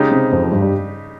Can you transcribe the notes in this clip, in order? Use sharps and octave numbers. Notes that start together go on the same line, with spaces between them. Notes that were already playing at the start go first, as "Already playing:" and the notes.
Already playing: C#3 G#3 D#4 G4
C3 C4
F2 F3
F3
G2 G3
G3